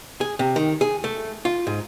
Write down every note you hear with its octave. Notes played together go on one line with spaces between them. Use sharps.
G#4
C3
D#3
G#4
A3
F4
G#2